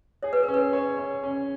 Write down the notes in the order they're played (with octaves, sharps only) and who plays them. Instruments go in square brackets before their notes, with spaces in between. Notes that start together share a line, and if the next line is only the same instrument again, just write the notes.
[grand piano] G#4 [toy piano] C#5
[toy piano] B4
[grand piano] C#4 [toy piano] A#4
[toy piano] B4
[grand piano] C#5
C#5
C#4